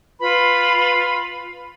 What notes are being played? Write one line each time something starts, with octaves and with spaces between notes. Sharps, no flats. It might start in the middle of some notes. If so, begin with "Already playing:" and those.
F4 B4 B5